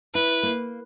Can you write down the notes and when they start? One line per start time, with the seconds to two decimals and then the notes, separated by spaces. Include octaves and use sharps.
0.14 E4 B4
0.43 A#3